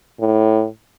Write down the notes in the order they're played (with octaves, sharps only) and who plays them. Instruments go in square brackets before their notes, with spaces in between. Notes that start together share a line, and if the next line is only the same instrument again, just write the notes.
[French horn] A2